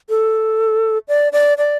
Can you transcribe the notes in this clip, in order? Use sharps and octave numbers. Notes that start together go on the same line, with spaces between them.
A4
D5
D5
D5